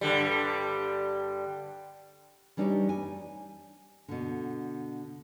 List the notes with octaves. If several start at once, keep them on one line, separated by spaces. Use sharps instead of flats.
G2 D3 G3
E3 G3 D4 D#4 G4 C#5
G#5
B2 D3